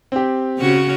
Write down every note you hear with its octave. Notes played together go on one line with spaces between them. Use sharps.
C4 G4
C#3 C#4 F#4